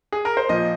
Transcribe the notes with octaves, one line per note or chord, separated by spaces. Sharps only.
G#4
A#4
C5
A#2 F3 D#5